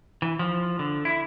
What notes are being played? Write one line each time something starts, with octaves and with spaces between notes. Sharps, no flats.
E3
F3
D3
E4